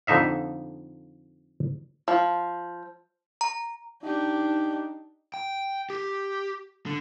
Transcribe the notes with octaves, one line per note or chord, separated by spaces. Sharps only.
F2 D3 D#4 E5 F5
F3
A#5
D4 D#4 G4
G5
G4
D3